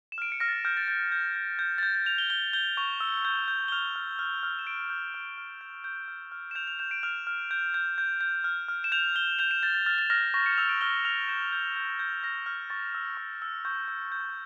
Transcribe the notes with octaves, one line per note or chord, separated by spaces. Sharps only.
E7
F6 D7
C#7
F6 A#6
A6
A#6
F6 G6
A6
G6 A6
G6
G6
G6
A6
G6
A6
G6 F7
G7
G6 G7
G6 G7
C#6 F7
E6
G6
G6
G7
F6 F7
F6
F6
F6
E7
G6 D7
G6
F6
F6
G6
G6
F6
F6
E7
G6 F7
F7
G6 E7
D7
F6 F7
F6
G6
G6
G6
G6
F6
F6
E7
G6 F7
G6 G7
G6 F7
E7
G6 A6
A6
F6 A6
A6
F6 A#6
C#6 A#6
C#7
E6 F7
D7
F6 G7
F6 F7
G6 E7
G6
G6
G6
F6 A#6
F6 G6
C#6 A6
E6
C#6
E6
C#6 G6
E6
G6